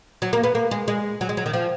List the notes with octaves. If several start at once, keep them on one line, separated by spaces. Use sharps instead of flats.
F#3
A#3
B3
A#3
G#3
G#3
F#3
G#3
F#3
D#3
F3